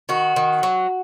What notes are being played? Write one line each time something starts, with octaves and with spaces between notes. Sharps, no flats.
D#3 F#4
D#3
F#3